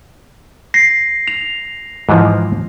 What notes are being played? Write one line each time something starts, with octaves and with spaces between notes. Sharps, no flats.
A#6 C7
F7
G#2 E3 F3